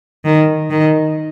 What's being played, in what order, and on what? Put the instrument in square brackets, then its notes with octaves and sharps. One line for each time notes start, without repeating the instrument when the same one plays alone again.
[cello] D#3
D#3